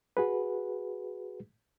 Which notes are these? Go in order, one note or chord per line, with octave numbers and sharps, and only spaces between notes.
F#4 G#4 B4